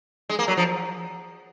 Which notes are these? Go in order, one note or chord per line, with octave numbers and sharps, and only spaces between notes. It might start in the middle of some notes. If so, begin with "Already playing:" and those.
G#3
A#3
F#3
F3